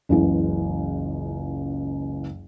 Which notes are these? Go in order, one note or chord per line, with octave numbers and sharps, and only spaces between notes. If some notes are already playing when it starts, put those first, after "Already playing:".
F#1 C#2 E3